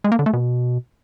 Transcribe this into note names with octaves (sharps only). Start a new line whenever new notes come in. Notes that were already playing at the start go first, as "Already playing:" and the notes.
G#3
A#3
D3
A3
B2